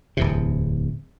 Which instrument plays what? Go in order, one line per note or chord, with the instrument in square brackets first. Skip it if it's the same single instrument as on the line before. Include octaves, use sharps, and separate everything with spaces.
[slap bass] D1 E2 C3